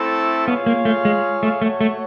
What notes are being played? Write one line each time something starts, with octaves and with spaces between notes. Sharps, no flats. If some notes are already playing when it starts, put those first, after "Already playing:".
Already playing: A3 C4 E4 A4
B3 F4 G#4 C#5 F5
A#3
A3
G#3
A3
A3 F#4 A4 C#5
A3